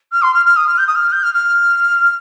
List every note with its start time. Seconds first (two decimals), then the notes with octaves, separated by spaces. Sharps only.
0.12 F6
0.22 C6
0.34 F6
0.45 F6
0.56 D#6
0.67 F6
0.78 G6
0.87 D#6
0.95 F6
1.12 G6
1.23 F6
1.34 F6